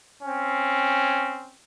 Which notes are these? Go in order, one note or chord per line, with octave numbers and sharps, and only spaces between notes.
C4 C#4